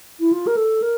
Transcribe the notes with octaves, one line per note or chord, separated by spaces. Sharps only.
E4
F4
A#4
A4
A#4